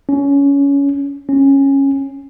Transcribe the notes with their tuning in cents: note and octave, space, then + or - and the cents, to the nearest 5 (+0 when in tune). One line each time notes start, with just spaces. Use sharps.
C#4 +20
C#4 -10